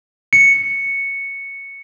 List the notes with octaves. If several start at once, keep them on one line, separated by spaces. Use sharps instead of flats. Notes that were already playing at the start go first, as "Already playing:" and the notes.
C#7